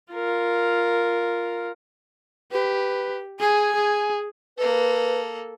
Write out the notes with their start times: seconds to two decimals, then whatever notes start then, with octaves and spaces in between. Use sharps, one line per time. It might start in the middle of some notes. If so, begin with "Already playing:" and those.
0.12 F4 A#4
2.52 G4 B4
3.40 G#4 G#5
3.76 G#4
4.58 A#3 A4 B4